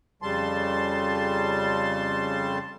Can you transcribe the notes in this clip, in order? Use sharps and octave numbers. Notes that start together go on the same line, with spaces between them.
F2 C#3 G3 A5 C6